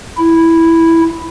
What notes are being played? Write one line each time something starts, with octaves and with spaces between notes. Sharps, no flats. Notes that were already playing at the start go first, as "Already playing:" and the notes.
E4